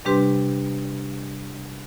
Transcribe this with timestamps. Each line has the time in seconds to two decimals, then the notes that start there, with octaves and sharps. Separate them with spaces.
0.05 C3 G3 D4 G4 B4 C6